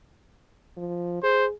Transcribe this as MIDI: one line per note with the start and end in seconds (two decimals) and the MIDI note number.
0.77 1.20 53
1.23 1.51 68
1.23 1.46 72